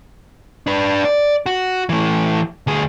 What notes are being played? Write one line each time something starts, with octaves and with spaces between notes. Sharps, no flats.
D4 B4
D5
F#4
E3 A3
D2 G#4